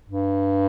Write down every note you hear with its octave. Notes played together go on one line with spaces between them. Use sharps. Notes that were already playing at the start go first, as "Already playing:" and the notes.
G2